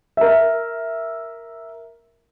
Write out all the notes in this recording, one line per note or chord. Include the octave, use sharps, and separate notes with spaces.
A#4 E5